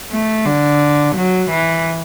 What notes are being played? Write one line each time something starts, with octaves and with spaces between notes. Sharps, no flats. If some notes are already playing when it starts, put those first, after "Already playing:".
A3
D3
F#3
E3